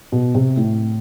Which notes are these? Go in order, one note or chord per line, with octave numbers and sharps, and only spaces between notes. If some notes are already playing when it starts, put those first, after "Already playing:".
B2
C3
A2